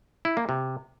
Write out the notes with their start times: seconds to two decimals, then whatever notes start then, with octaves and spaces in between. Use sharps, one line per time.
0.25 E4
0.37 A#3
0.49 C3